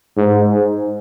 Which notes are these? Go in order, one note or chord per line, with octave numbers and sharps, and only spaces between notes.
G#2